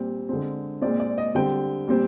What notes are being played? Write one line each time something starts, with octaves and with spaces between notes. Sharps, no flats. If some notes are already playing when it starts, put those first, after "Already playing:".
Already playing: A#2 G3 C4
D3 G#3 C4
A#2 G#3 C4 D5
D5
D#5
D3 G3 C4 G5
A#2 G3 C4